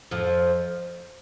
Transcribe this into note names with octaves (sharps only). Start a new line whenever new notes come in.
F2 F3